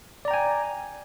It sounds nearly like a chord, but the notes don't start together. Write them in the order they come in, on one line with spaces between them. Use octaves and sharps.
D5 A#5 G5 G#5